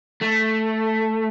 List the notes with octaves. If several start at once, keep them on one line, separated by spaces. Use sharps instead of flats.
A3